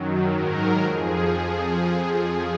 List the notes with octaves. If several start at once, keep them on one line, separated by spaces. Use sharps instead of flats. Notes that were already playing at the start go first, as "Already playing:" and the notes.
Already playing: F#2 D#3 F#3
G#2 D#3 F#3 A#4
F2 F3 G#4